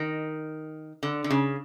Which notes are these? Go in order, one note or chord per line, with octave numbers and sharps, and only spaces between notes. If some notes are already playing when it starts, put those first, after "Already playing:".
Already playing: D#3
D3
D3
C#3